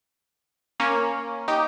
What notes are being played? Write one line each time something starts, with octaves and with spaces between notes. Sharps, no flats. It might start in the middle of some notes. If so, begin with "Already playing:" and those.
A#3 C#4
D#4 G4